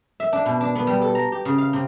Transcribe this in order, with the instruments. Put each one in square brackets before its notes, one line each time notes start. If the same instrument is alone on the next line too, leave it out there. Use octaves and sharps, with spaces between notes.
[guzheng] E5
D4
B2
D4
B3
G3
A4
A#5
G4
C#3
F5
C3